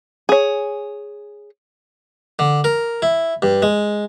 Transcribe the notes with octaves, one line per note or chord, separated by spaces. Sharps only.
G#4 C#5
D3
A#4
E4
G2
G#3